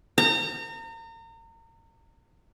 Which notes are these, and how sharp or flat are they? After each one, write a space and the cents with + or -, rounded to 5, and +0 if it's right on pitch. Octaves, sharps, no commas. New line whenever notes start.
A#5 -35